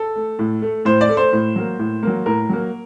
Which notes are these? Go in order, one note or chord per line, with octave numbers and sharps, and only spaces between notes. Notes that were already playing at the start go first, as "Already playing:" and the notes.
Already playing: A4
A3
A2
A3
A2 C5
D5
A3
C5
A2
F#3 A#3
A2
F#3 A#3
A2 A#4
F#3 A#3